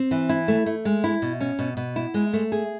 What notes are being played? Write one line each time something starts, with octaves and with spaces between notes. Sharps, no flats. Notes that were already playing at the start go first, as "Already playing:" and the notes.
Already playing: C4
E3
E4
A3
A3
G#3
E4
B2
C#4
B2
B2
E4
G#3
A3
G#4